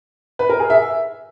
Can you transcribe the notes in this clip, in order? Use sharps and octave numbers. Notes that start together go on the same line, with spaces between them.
B4
A#4
G#4
E5